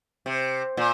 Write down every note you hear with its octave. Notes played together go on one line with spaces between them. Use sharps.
C3
A#2